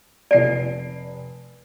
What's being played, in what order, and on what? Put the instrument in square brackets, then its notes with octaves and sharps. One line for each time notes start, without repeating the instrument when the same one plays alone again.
[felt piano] F1 C7 D7 [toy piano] D5